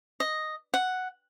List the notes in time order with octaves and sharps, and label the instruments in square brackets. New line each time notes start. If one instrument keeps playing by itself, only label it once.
[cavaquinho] D#5
F#5